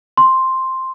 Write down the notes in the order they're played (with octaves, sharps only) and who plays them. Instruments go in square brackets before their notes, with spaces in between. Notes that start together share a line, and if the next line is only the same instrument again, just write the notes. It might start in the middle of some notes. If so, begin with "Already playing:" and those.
[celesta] C6